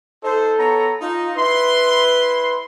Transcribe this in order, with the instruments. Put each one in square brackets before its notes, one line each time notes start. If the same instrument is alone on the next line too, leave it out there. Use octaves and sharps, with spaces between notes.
[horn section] D#4 C5 [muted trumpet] A4
[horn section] B3 C#5 A#5
[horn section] D#4 [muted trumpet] F4
[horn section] E4 C6 [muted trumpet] B4